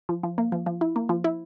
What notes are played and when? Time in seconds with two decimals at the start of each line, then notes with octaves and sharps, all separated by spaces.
0.09 F3
0.23 F3
0.38 A#3
0.52 F3
0.66 F3
0.81 E4
0.96 A#3
1.09 F3
1.24 E4